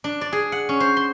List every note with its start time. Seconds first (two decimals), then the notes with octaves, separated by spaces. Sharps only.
0.04 D4
0.21 D5
0.32 G#4
0.52 F#5
0.69 C#4
0.80 C5
0.97 C6